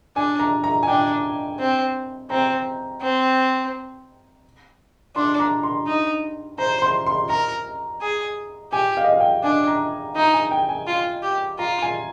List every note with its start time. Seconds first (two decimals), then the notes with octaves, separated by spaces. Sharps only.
0.16 D4 G#5
0.39 A#5
0.64 A#5
0.83 G#5
0.87 D4 G5
1.59 C4
2.30 C4 A#5
3.01 C4
5.16 D4 C6
5.40 A#5
5.63 C6
5.87 D#4
6.58 C5 A#5
6.82 C6
7.06 C6
7.29 A#4 A#5
8.01 G#4
8.73 G4 G#5
8.97 F5
9.04 D#5
9.13 F5
9.20 G5
9.44 D4 G#5
9.67 A#5
10.16 D#4 A#5
10.34 G#5
10.51 G5
10.69 G#5
10.87 F4
11.23 G4
11.59 F4 A#5
11.82 G#5